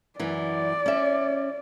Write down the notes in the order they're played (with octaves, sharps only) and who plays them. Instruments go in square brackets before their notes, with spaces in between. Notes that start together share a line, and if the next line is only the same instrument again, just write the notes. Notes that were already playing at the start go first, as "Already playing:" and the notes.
[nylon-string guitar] F#2 E3 [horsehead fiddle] D5
[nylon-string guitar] C#4 E5